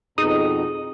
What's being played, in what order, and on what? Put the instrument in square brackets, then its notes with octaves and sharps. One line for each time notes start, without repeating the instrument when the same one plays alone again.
[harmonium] F2 B2 A#5 [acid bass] D#4 [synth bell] G#4 [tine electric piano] D#6